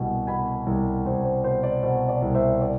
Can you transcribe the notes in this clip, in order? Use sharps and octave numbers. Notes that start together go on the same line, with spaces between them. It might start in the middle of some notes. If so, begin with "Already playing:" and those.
Already playing: C2 B2
B2 G#5 B5
C2
C2 C5
C5
B2 C5
D5
B2 C5
D5
C2
C5 E5
D5